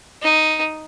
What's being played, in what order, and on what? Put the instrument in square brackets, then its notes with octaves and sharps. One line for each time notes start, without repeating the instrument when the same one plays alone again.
[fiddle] D#4